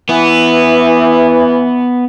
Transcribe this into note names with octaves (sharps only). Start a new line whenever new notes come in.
E3 B3